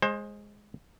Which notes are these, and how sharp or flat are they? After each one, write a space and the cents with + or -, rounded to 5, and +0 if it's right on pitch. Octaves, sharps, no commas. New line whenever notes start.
G#3 +0 C5 +25